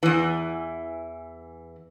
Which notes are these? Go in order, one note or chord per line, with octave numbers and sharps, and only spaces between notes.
E2 E3